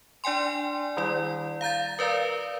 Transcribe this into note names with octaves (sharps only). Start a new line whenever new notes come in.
D4 D5 G5 G#5 C6
D#3 G3 E4 D5
F5 A#5 G6 A6
A#4 B4 D5 F5 A#5